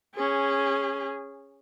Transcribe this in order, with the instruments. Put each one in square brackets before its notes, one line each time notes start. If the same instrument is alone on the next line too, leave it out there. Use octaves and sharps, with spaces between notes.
[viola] C#4 G#4